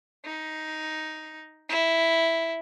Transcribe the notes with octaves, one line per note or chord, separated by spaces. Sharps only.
D#4
E4